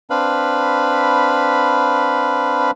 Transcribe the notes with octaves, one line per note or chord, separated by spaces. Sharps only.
C4 D4 B4 F5 B5